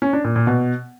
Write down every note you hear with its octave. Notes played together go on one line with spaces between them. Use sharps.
C#4
D4
A#2
A#2
B2